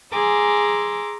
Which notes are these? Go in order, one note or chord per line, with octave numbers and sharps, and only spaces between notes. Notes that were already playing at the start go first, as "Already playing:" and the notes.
G#4 G#5 A#5 C6 D6 E6